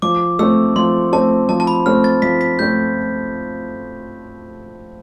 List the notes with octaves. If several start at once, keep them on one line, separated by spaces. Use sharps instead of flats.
F3 D6
A3 C4 E6
F3 C6
A3 C4 A5
F3 A5
A5
B5
A3 C4 F6
A6
F3 B6
B6
A3 C4 G6